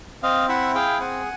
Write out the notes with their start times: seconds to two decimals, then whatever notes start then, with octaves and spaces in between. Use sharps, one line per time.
0.23 C4 D#5 F5
0.48 E4 E5 F#5
0.75 G#4 F5 G5
1.00 C4 F#5 G#5